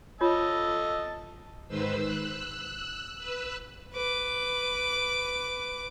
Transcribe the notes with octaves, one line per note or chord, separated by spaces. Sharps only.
F4 C#5 D#5 A5 E6
G#2 D#3 B4 C5 E6
E6 F#6
B4 E6 F#6
B4 D6